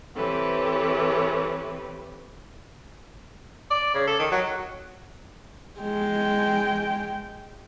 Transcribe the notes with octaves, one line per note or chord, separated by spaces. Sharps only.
E3 C4 G4 A4 B4 C#5
D5
C#3
A4
D#3
F#3
G#3 G5